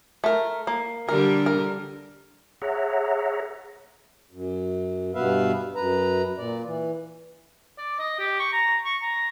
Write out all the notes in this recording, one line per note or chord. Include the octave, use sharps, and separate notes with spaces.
A3 A#4
A#3
D3 G3 A#4
A#4
G#4 C#5 E5 F#5 A#5
F#2
G2 B2 B3 B4 E5 F5
F#2 B4 A#5
A#2 D5
E3
D5
D#5
G4
C#6
A#5
C#6
A#5